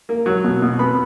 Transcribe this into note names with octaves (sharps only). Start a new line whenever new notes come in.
A#3
F#3
B2
B2
B3 B5